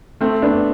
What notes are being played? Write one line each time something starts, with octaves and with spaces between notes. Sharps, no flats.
A3 C4
B3 D4